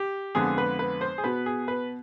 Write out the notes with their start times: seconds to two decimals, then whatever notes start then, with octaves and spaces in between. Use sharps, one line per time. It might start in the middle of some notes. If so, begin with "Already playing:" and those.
Already playing: G4
0.35 F2 D3 G#3 B3 G#4
0.58 B4
0.79 B4
1.01 C5
1.18 G#4
1.24 B2 B3 B4
1.46 G#4
1.68 B4